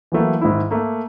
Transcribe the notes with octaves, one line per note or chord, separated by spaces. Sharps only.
E3 F#3 A3 A#3
G#2 D#3 E4
A3 A#3